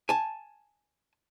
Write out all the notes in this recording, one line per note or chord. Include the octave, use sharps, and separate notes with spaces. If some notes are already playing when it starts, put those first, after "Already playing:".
G#5 A5